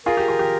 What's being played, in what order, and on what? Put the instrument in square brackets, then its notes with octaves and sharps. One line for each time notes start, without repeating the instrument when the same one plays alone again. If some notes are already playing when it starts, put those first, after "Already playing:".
[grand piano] F4 G#4 [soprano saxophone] A#4
[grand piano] G4
F4 G#4
G4